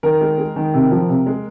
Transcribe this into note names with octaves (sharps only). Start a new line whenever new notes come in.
D#3 A#4
G#3
G#3
D#3
C3
F3
C3
G#3